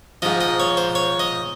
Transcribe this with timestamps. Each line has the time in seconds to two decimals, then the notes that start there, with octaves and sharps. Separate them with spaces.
0.22 G#2 F3 D#5
0.41 D#5
0.60 C#5
0.77 C5
0.95 C#5
1.20 D#5